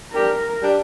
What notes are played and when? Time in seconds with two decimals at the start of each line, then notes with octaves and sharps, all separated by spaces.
0.13 G3 D4 G4 A#4
0.60 G3 D4 G4